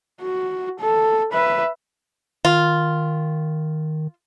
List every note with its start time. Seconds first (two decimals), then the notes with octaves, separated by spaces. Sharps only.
0.22 F#4
0.80 A4
1.33 B4 E5
2.45 D#3 F4